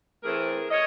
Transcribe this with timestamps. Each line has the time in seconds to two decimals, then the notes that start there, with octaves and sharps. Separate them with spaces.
0.24 E3 A3 C4 G#4 A#4
0.71 C#5 D#5